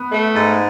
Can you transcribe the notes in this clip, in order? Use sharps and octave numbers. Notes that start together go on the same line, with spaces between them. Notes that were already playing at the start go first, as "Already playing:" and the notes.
Already playing: B3
A3
G#2